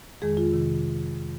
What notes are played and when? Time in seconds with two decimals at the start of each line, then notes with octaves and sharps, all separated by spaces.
0.22 F2 D#3 G#3 G#4
0.37 F4
0.53 C3 D#3